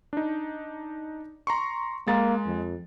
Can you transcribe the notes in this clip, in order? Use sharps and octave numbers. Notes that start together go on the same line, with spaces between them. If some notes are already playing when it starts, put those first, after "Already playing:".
D4 D#4
A#5 C6 C#6
G#3 A#3 A6
F2